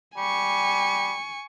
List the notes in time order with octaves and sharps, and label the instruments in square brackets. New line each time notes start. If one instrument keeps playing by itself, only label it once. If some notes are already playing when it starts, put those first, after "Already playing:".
[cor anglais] G3 [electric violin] G#5 C#6